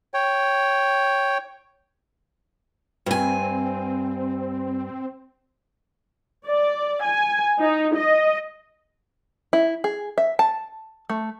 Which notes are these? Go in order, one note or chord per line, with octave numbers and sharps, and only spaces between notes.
C#5 G5
G2 C4 G#5
D5
G#5
D#4
D#5
E4
G#4
E5
A5
A3